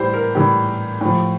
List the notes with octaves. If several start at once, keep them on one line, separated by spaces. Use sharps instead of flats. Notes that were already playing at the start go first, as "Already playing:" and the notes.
Already playing: A2 E3 G3 G4 C5
A#4
A2 E3 G3 G4
A2 F3